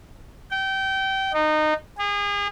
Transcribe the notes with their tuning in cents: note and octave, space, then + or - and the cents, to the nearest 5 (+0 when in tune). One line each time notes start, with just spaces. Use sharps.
G5 -25
D#4 -20
G#4 -35